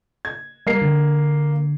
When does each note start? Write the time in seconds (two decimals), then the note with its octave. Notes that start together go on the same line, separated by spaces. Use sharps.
0.25 G#6
0.67 G3 A#3 C7
0.82 D3